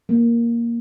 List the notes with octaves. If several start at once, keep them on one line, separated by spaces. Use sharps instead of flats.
A#3